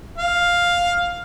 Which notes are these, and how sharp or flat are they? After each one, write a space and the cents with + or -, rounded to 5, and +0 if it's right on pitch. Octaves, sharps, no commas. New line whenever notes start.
F5 +5